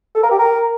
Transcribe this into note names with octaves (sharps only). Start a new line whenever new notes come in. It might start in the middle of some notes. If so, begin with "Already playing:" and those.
A4
A#4
G4
A#4